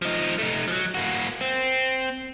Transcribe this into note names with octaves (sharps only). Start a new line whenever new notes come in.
F3 D#4
A3 D#4
F3 F#3
A#3 F#4
C4